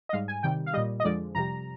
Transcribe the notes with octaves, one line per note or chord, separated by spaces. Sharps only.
D#5
G#2 G3 F5
G#5
C3 D#3 G3 G5
F5
A#2 G3 D#5
D#5
F2 D3 F3 G#3 D5
F2 C3 G3 A#5